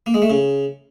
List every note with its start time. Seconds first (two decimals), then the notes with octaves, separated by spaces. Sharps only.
0.06 A#3
0.14 G#3
0.22 A3
0.30 C#3